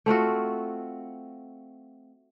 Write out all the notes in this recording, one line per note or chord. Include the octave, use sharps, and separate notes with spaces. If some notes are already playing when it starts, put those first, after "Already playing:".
A3 C4 F4 F#4